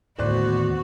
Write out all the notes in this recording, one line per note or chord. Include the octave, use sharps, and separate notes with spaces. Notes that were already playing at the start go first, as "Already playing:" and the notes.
D#2 A2 D3 B3 F#4 C5 D5 F#6